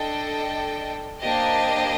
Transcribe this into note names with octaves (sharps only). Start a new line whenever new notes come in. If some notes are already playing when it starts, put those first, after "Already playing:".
Already playing: D4 A4 D#5 G5
A#3 D4 G4 C5 D#5